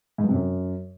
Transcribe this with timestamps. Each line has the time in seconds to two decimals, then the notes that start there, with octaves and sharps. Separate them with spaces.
0.18 G#2
0.24 G2
0.29 C3
0.34 F#2